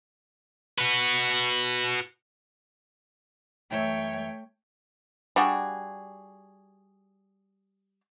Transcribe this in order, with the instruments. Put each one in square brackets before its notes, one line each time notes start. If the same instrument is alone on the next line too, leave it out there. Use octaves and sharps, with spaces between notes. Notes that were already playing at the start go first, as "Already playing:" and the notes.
[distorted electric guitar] F#4 B4
[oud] F#2 E3 E5 [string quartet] A3 [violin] C#5 G5
[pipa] G3 D4 F#4 G#4